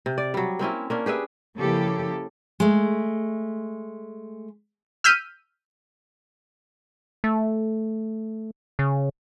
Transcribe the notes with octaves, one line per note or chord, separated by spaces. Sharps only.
C3
D5
F#3 G3
A#3 C4 C#4 E4
A#3 C#4 D4
G4 G#4 B4 E5
C#3 F3 A#3 E4 G4 A4
G#3 A3
E6 F6 G6 B6 D#7
A3
C#3